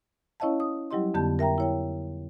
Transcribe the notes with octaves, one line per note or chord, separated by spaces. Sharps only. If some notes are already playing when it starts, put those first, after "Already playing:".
C#4 E4 C#5 D#5 F5 A5
D#6
F#3 G3 E4 G4 D#5 C6
F2 D3 B3 G4 A5 G6
A#4 E5 G5 A#5
E4 C#5 G5